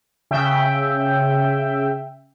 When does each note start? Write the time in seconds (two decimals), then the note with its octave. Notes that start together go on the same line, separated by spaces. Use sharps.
0.31 C#3 E5 G5